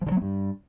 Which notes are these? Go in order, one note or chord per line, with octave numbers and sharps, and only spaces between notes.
F3
D3
F#3
B3
G2